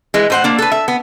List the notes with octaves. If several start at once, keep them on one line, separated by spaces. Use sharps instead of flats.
E3 G#3
A2 C5 F#5
A#3 D4
A4 B4
E5
B3